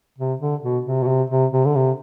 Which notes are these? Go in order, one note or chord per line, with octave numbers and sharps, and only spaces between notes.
C3
D3
B2
C3
B2
C3
C3
C3
D3
C3